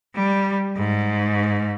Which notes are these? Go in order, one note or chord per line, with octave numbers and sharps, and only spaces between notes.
G3
G#2